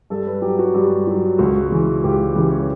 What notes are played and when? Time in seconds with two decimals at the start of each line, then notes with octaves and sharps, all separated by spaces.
0.10 G2 A4
0.27 B4
0.42 F#3 G4
0.59 F#4
0.74 G2 G4
1.07 F#3 F#4
1.38 C#2 F#4
1.70 C#3 E3
2.04 C#2 G4
2.35 C#3 E3 G4
2.50 C#5
2.59 B4